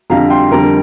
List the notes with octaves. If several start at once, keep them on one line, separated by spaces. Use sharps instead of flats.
F2 D3 G3 F5 A#5
G5 C6
F2 D3 G3 A#4